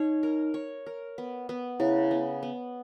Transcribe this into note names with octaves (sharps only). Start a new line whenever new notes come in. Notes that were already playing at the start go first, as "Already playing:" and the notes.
Already playing: D#4 C#5
A#4
C#5
A#4
B3
B3
C#3 E4
B3
B3